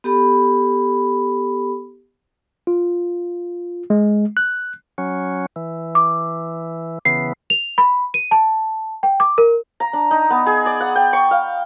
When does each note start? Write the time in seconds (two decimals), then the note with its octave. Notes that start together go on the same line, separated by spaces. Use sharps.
0.04 B3 G4 A4 B5
2.67 F4
3.90 G#3
4.37 F#6
4.98 F#3 C#4
5.56 E3
5.95 D6
7.05 C#3 E3 B3 C7
7.50 F7
7.78 B5
8.14 D#7
8.31 A5
9.03 G5
9.20 D6
9.38 A#4
9.80 A#5
9.93 D4
10.11 D#4
10.30 B3
10.46 G#4
10.66 D5
10.80 F#5
10.96 G5
11.13 C#6
11.31 F5